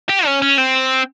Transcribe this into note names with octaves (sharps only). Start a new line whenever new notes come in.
G4
C#4
C#4
C4